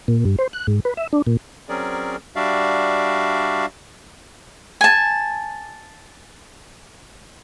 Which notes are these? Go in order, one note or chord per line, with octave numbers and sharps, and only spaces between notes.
A#2
G2
C5
F#6
G#2
B4
E5
D4
A#2
F#3 C4 C#4 G#4 A#4 D5
G3 D4 F#4 D5 E5 F5
G#5 A5